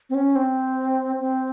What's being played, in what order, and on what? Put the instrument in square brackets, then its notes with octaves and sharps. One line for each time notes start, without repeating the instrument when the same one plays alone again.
[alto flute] C4
C#4
C4
C4